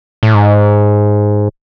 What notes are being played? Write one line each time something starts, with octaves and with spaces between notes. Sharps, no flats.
A2
G#2